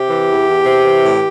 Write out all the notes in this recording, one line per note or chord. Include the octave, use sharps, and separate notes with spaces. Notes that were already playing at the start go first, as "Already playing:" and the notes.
Already playing: C3 G4
E3
E2
E2
C3
E3
A2